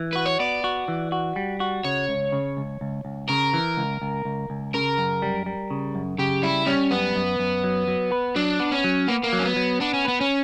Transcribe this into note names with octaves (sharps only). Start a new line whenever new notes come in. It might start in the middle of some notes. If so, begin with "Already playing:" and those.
Already playing: E3
F#4 B4
C#5
B3 D5
F#4
E3
F#4
G3
F#4
C#3 C#5
C#2
C#3
C#2
C#2
C#2
C#3 A#4
E3
C#2
C#2
C#2
C#2
C#3 A#4
F#2
G3
G3
C#3
F#2
C#3 G4
G3 E4
G3 C#4
F#2 B3
F#2
F#2
F#3
F#3
B4
F#3 D4
B3
C#4
F#3
A#3 B3
A#3
F#3
C#4
B3
F#3
B3 D4
C#4
B3 B4
C#4